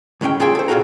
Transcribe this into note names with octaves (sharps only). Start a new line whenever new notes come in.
C#2 A2 G#3 C#4 G5
A#3 F4 G#4 A4 G5 G#5
A4 C5
A#2 C#3 C#4 F4 F#4 A#5